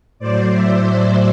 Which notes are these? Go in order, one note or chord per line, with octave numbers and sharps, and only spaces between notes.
A2 F#3 C5 D5
D5 E5